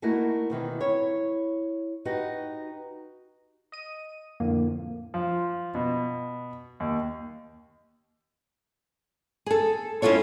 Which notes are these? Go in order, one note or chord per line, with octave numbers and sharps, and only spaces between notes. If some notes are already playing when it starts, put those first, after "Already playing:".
A3 A#3 D#4 E4 F#4 A#4
B2 D#3 E3 C4
E4 C#5
D#4 F#4 G4 B4 D#5
D#5 D#7
F2 A2 D3 A#3
F3
B2
D#2
G#4 A4
C#4 E4 F4 A4 C#5